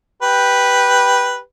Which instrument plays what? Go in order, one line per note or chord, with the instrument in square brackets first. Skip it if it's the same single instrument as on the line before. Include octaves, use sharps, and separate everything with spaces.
[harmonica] G4 B4